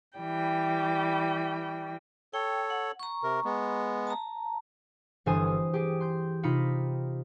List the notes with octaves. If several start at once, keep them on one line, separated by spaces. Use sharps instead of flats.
E3 G3 G5
A4 C#5 G5
F#5
A#5 C#6
C3 A#4
G#3 B3
A5 A#5
G1 E3 A4 C5 G#5 D#6
G#5
G4 G#4
C6 G6
C3 D#4 F4 B5 C#7